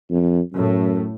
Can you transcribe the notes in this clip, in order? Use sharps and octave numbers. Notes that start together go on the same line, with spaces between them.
F2
F#2 A2